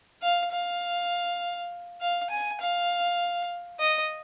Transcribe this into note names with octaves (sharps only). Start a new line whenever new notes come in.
F5
F5
F5
G#5
F5
D#5